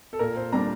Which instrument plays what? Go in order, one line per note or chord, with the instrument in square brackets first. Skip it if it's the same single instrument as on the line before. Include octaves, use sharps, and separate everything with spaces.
[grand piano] A4
A#2 A#4
C5
G3 A#3 D4 A#5